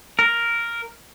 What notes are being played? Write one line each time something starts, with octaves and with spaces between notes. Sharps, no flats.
A#4